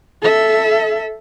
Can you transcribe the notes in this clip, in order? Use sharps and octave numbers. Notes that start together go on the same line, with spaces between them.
A4 E5